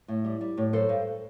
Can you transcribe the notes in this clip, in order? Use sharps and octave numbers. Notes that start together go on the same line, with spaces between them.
A2
G3
G3
A2
F#3 A4 C5
G2